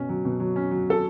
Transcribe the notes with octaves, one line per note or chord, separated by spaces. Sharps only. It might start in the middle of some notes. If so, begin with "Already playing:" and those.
Already playing: B2 C#4
F#3
B2
F#3
C#4
F#3
A4